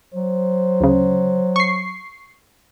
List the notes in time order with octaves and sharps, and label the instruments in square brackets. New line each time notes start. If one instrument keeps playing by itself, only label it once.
[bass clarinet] F#3 [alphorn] C5
[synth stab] D2 C#3
C#6 C7